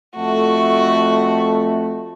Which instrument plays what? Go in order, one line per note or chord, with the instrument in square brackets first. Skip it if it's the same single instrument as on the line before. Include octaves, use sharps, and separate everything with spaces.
[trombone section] F2 A3 [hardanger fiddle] F#4